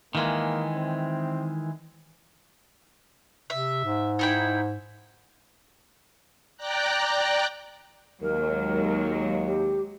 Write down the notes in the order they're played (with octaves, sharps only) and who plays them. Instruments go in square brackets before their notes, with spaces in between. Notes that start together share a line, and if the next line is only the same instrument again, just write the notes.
[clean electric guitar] D#3 E3 G#3 [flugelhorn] A#3
[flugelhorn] C4
[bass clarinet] C3 [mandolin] E5
[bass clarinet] G#2
[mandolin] D#4 E4 G5
[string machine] D5 G5 A#5 F#6
[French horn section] D#2 [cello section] F#3 G#3 [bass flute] A#4
[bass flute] G4